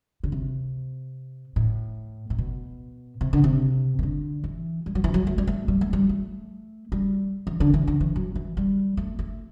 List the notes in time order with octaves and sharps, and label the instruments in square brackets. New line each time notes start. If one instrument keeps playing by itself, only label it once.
[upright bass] D3
C3
A2
A2
B2
C3
D3
C3
E3
D3
E3
G3
F#3
E3
F#3
A3
G3
A3
G3
A3
G3
A3
G3
E3
D3
E3
D3
E3
F#3
E3
G3
A3
A3